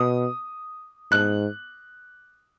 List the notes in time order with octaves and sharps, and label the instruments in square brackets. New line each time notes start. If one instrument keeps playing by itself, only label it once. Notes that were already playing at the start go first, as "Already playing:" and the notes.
Already playing: [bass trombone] B2 [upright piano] D#6
[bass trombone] G#2 [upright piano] F#6